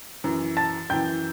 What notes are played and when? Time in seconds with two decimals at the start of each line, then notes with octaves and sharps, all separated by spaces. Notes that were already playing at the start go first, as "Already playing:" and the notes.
0.24 F#2 E3
0.57 A5 A6
0.89 F#2 E3 G5 G6